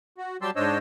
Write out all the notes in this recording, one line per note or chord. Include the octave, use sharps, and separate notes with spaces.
F#4
F#3 G3 G4 A5 C6 E6
G#2 D4 C5 C#5 D#5 E6